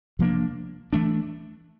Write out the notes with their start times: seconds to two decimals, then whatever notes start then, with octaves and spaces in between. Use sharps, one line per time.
0.19 C3 F3 A#3 D4
0.93 E3 A3 D4